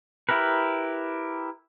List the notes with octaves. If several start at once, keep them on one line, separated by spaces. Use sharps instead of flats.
E4 G4 A#4 B4